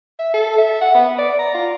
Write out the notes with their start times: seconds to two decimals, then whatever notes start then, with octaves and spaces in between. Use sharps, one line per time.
0.19 E5
0.34 A4
0.58 E5
0.81 F#5
0.94 B3
1.18 D5
1.39 A#5
1.54 F4